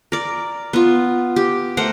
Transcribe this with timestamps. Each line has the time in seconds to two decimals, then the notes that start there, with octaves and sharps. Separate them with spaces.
0.12 A#4 D5
0.73 B3 F4
1.36 G4
1.77 A3 A#4 C5 F#5